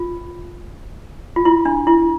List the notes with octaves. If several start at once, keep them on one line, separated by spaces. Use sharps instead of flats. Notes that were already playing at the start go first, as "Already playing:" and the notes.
Already playing: F4
F4
E4
D4
E4